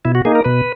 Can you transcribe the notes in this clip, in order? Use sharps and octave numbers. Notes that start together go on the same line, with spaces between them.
B2 E4
F#4
A#3 D#4 G#4
A#4
B2 B4